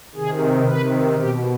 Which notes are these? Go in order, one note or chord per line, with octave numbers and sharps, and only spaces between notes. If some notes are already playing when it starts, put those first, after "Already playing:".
C3 D#3 G#4
C3 D#3 B4
B2 G4